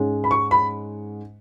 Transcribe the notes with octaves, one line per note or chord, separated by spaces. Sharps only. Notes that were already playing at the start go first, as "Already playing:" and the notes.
Already playing: G#2 G#3 C#4
B5
C#6
B5